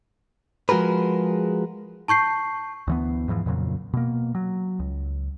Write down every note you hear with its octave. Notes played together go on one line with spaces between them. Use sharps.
F3 G#3 F#4 G#4 A#4 B4
A5 C#6 G6 C7
D2 E3 B3
E2 G#2 E3 F3
F2 A#2 C#3 F#3
B2 A#3
F#3
C#2